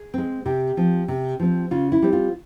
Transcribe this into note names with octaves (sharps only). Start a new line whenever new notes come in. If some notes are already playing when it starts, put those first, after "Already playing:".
Already playing: G#4
G#3 C4
C3 G4
F3 C4
C3
F3 C4
C#3 F4
E4
G3 C4
F4